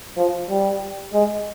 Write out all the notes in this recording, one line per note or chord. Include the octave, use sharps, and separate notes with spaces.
F3
G3
G#3